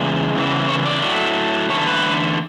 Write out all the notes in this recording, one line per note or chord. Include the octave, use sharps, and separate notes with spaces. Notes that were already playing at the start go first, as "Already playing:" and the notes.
Already playing: E2 C#3 G#3
E2 C#3 E3
C#5
D5
A2 F#3 A3
E2 D3 A3 C#5
B4